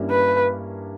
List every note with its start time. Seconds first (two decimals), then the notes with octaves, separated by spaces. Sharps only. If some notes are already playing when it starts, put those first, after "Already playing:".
Already playing: G2 G3 A#3 C#4 E4
0.10 B4